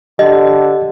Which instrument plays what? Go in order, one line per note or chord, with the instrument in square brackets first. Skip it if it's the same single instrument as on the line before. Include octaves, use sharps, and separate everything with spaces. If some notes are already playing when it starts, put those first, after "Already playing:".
[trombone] D3 [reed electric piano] G4 [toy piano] D#5